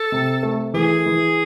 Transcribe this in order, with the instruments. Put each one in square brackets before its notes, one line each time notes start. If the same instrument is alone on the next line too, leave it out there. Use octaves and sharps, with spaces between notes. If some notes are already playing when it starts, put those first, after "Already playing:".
Already playing: [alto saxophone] A4
[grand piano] C3
A3
[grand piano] E3 [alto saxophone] G#4
[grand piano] E3